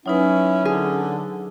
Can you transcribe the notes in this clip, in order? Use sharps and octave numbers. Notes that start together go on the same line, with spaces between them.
F#3 C#4 D#4 E4 B4
D3 G#4